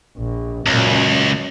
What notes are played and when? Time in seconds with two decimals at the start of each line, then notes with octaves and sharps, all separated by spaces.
0.18 A#1
0.67 C#2 F#2 A#2